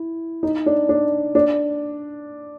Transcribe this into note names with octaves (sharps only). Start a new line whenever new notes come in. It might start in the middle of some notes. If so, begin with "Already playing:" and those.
Already playing: E4
D#4
D4
D4
D4